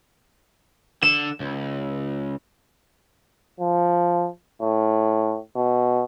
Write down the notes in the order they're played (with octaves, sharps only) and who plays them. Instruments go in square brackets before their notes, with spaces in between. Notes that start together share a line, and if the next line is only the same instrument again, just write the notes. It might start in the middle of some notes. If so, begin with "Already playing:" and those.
[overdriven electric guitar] D3 [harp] E7
[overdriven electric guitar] C#2
[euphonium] F3
A2
B2